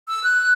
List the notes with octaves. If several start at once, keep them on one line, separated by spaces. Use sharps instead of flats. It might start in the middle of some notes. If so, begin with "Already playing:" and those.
E6
F#6